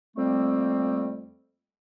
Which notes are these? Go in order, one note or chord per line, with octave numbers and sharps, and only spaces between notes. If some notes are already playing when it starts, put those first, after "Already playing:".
F2 G3 A3 A#3 C4